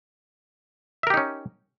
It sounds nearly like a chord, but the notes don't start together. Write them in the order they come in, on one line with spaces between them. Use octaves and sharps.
E5 A#4 G4 D#4 C#4